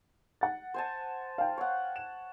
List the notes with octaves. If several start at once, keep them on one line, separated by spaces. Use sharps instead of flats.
F#5 A6
C5 G#5 A5
F5 G5
C#5 F#5
E7